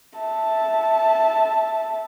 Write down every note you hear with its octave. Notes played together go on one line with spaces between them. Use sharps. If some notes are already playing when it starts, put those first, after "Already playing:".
E5 A5